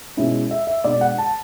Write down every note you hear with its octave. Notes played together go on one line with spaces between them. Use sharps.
B2 G#3 C#4 E4
E5
E5
B2 G#3 D4 D5
F#5
A5